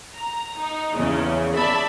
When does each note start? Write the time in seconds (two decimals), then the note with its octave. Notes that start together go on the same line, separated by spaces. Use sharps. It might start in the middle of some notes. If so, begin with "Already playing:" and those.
0.14 A#5
0.59 D#4
0.95 E2 C#3
1.55 D5 E5 A5 B5